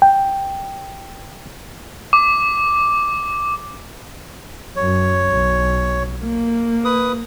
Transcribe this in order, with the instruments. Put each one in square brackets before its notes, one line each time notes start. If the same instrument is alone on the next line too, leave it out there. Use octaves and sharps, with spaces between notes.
[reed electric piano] G5
[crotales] D6
[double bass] F#2 [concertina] C#5
[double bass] B1
A#3
[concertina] B4 D#6